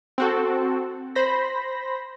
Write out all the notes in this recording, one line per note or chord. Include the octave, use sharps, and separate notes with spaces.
C4 F#4 A4
C5 B5 A#6